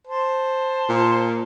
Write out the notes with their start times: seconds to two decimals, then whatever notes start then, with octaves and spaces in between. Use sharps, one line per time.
0.07 C5 A5
0.89 A#2